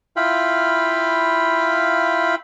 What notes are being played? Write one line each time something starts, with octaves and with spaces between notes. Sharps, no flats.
E4 F4 F5 G5 B5